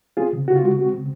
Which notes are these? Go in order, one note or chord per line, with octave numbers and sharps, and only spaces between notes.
C4 F4 G#4
C#3
C#3 F#4
F4
G#3 F#4
C4 F#4
C#3